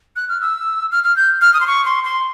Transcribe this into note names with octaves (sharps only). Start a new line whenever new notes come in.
F#6
F6
E6
F6
F6
G6
F6
D#6
C6
C#6
C6
C6